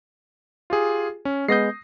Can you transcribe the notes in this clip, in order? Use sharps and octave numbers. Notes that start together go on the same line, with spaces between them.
F4 G4 G#4
C#4
G#3 B3 D#6 G6 A#6 C7